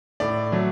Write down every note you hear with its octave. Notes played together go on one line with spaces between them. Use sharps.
A2 D5
F#3 A3